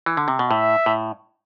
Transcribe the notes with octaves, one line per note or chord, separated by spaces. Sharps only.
E3
D3
C3
B2
A2 E5
A2